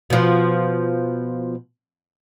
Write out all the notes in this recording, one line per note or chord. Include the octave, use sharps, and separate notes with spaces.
B2 F3